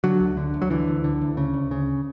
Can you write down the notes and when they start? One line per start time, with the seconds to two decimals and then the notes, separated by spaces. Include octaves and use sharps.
0.04 D3 F#3
0.20 D2
0.37 D3
0.54 D2
0.62 F#3
0.70 D3 E3
0.88 D2
1.04 D3
1.21 D2
1.37 C#3
1.54 D2
1.71 C#3